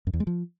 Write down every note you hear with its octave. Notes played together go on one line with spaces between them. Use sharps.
F#2
E2
G#3
F3